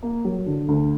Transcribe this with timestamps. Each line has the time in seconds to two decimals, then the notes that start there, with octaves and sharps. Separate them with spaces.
0.03 A#3
0.25 F#3
0.46 D3
0.68 D2